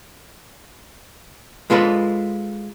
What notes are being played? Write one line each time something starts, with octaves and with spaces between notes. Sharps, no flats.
G#3 F4 A4 B4